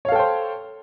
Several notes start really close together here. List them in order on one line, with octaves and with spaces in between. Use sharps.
C#5 F5 A4 G5 C5